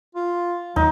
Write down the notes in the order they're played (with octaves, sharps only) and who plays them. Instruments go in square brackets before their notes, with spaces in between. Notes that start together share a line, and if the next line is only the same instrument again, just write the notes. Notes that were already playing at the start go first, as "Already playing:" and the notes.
[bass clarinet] F4
[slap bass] D#2 A3 [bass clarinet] F#3 [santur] D#4